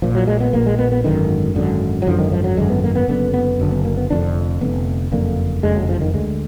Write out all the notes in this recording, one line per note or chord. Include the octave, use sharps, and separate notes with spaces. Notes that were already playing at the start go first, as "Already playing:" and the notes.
A#1 A#2 F3
F#3
G#3
B3
A#1 A#2 A#3
G#3
B3
B3
G#1 F#2 D3 D#3
G#1 F#2 D3
F#3
G#1 F#2 D3 F3
D#3
F3
F#3
G#1 F#2 D3 G#3
B3
A#3
B3
F#1 F#2 D3 B3
B3
F#1 F#2 D3
B3
A#3
B3
F1 F2 D3 D4
F1 F2 D3 B3
F#1 F2 D3 A#3
F#1 F2 D3 G#3
F#3
F3
D#3
D2 D3 G#3